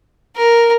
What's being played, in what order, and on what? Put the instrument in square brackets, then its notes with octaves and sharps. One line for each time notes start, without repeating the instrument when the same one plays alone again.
[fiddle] A#4